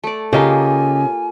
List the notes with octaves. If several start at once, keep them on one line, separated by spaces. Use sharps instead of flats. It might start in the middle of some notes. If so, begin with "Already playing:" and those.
A3 D5
C#3 A#3 F4 G4 A4 D#5 G#5 A#5